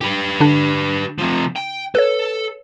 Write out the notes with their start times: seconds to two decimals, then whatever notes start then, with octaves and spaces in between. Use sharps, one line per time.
0.01 G4 B4
0.40 D3 D4
1.19 C3 F3
1.56 G5
1.95 A4 B4 C#5